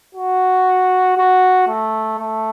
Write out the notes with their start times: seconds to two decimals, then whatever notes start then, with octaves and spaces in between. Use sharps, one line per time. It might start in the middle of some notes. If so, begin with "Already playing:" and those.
0.15 F#4
1.17 F#4
1.68 A3
2.18 A3